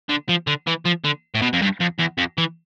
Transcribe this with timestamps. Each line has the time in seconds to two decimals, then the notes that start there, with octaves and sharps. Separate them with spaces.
0.09 D3
0.29 F3
0.47 D3
0.67 E3
0.85 F3
1.04 D3
1.35 A2
1.42 B2
1.53 F2
1.62 G2
1.81 F2
1.99 E2
2.18 F2
2.38 E3